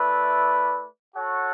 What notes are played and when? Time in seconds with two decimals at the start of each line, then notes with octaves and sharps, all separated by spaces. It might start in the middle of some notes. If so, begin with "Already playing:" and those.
Already playing: A3 E4 B4 D5
1.16 F#4 A4 C#5 F#5